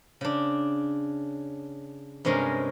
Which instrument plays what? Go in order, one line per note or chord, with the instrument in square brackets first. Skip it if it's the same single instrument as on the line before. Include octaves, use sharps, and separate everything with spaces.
[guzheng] C#3 D4
G2 C3 G#3 C#4 A#4 A#5